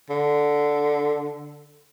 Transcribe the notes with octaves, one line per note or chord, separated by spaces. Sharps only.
D3